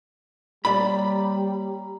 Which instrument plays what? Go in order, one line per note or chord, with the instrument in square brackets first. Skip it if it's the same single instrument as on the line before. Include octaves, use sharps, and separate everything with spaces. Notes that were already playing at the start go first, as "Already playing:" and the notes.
[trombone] G3 [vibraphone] A#3 C#5 A#5 [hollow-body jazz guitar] D5 B5